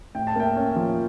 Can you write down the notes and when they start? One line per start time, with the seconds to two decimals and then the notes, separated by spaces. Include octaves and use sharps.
0.15 A2 G5
0.27 A5
0.36 A#3 E5 G5
0.56 C#4
0.76 F3